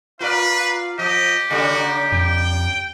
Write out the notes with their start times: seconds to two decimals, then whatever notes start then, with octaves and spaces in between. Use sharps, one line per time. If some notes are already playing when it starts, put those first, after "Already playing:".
0.21 F4 A#4 B4 D5 F5
0.99 F3 G4 D#5
1.50 C#3 G3 A#3 F#4
2.12 F2 G5